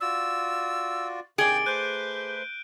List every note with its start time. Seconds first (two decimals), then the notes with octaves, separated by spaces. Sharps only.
0.01 F4 F#4 D5 E6
1.38 C3 D#3 G#4 D5 G5 D7 G7
1.66 A3 B4 C5 F#6 G6 D#7